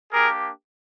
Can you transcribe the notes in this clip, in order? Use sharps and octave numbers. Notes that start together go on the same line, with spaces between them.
A#3 D4 G4 G#4 A#4